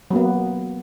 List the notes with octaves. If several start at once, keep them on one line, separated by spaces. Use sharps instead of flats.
F#3 A#3 B3